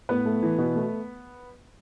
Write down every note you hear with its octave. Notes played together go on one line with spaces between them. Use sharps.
A2 B3 B4
A3
E3
B2
A3